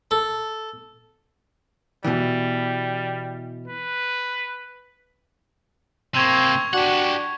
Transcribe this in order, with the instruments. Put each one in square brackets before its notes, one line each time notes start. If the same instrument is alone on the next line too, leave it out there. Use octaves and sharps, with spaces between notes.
[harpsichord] A4
[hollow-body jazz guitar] B2 E3 [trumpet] G3
[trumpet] B4
[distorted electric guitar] C3 A#3 [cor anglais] C4 [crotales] C#6 G#6 F7
[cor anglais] D4 [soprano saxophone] F#4 [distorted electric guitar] G4 F#5